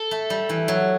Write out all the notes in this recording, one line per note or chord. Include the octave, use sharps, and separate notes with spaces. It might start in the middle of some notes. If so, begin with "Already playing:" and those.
Already playing: A4
A3
G3
E3
F#3